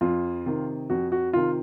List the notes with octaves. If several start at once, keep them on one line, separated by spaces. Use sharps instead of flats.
F2 F4
C3 D#3
F2 F#4
F#4
C3 D#3 F4